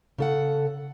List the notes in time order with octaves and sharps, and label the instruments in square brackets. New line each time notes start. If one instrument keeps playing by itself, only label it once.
[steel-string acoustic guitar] C#3 A4 F#5